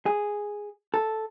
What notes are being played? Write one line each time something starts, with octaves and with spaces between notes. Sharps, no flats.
G#4
A4